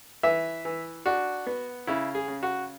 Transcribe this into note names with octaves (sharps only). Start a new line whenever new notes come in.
E3 E5
E3
D4 F#4
B3
C#3 E4
G#4
C#3
F#4